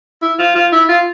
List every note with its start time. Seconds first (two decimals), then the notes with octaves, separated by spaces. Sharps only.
0.22 E4
0.39 F4
0.55 F4
0.72 E4
0.89 F4